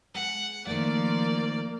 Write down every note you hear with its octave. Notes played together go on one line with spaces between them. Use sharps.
G#3 F#5
D#3 F3 A3 A#3 D5